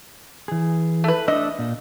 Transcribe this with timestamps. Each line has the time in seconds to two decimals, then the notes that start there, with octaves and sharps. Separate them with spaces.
0.48 E3 G#4
1.04 A3 B4
1.28 A3 D4 D#5 E5
1.59 A#2